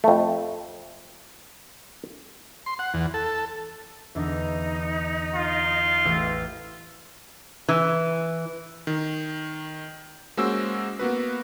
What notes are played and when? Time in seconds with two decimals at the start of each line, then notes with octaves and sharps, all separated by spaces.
0.04 F2 A3
2.66 C6
2.79 F#5
2.94 E2
3.14 A4
4.15 E2 D3 D4 D#4
5.35 F4
6.05 A1 E6 G6
7.69 E3
8.87 D#3
10.37 G#3 A#3 C#4 F#4 C5 E6
10.99 A#3 B3 F#4 B4